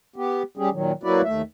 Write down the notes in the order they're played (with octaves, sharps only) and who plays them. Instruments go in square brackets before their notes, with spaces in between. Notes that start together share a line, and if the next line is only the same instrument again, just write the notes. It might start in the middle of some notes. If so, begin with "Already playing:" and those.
[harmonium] B3 G4
G3 C#4 G4 G#4
A#2 D#3 F#3
F#3 A#3 E4 F#4 B4 D5
D#2 A3 E5